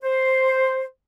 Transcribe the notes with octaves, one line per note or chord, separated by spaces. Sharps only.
C5